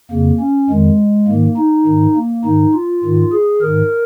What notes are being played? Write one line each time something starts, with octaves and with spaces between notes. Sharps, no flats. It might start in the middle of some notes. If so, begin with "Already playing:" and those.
F2 C#3 A#3
C#4
F2 D#3 G#3
G#2 D#3 A#3
D#4
G#2 D#3
A#3
G#2 D#3 D#4
F4
G#2 D#3
G#4
G#2 D#3 A#4